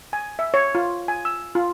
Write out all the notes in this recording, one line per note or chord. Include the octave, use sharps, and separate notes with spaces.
G#5
E5
C#5
F4
G#5
E6
F4